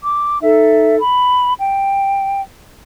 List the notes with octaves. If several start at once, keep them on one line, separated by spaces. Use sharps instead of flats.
D6
D#4 A4 E5
B5
G5